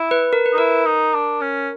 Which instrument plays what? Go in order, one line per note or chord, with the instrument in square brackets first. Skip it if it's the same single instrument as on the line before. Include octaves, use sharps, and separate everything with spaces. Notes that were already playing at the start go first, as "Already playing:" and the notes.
Already playing: [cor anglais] E4
[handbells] B4
A#4
B4
[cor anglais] D#4
[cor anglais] E4 [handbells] A#4
[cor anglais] D#4
D4
C#4